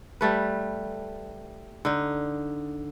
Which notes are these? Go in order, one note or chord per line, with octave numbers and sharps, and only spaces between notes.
G3 A3 B4
D3 D#4